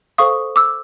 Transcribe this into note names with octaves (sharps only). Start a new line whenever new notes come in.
A4 C5 F5 C#6 D#6
D6 E6